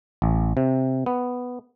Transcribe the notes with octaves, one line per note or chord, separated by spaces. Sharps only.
A1
C3
B3